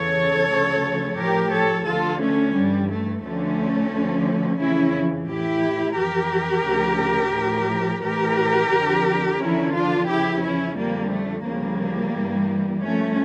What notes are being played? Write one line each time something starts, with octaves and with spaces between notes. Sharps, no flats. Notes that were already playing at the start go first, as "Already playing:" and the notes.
Already playing: E2 C#3 E3 A4 C#5
D2 C#3 F3
A2 F3 G4 A#4
A4 C#5
D2 D3 F3 F4 A4
A3 C#4
G2 E3 G3
A3
D2 D3 F3 A3 C#4
D2 D3 F3
F2 C#3 E3 C#4 E4
A2 E3 E4 G4
F2 E3 G4 A#4
D2 C#3 F3
A2 F3
A2 E3 G4 A#4
F2 D3 F3
E2 D3 F3 C#4 E4
D4 F4
E2 C#3 F3 E4 G4
C#4 E4
F2 D3 F3 G3 A#3
A3
D2 C#3 F3 G3 A#3
G2 E3
G2 F3 A3 C#4